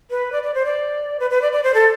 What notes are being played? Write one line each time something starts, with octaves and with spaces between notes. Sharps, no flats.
B4
D5
D5
C5
D5
B4
B4
D5
D5
C5
A4